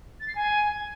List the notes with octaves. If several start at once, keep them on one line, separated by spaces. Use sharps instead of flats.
A6
C7
G#5